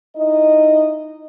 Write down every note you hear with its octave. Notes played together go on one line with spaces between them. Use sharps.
D#4 E4 D#5